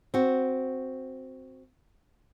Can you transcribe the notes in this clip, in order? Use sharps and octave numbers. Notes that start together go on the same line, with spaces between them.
C4 F#4